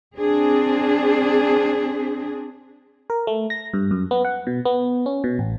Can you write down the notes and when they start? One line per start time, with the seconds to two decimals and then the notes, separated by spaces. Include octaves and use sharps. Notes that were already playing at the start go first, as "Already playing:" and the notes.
0.17 C4 D4 G#4
3.10 A#4
3.27 A3
3.50 A#6
3.74 G2
3.91 F#2
4.11 B3
4.25 F#5
4.47 B2
4.65 B3
5.06 C#4
5.24 B2
5.39 A1